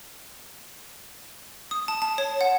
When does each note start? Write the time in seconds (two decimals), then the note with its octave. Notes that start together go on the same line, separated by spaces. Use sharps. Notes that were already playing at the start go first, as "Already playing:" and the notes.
1.71 D#6
1.88 A5
2.02 A5
2.18 C#5
2.41 F#5